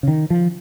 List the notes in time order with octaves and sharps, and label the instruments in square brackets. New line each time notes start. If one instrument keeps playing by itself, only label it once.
[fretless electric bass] C#3
D#3
F3